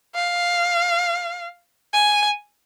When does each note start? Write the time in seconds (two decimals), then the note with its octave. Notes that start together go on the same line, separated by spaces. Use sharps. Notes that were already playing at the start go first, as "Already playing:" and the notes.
0.15 F5
1.93 G#5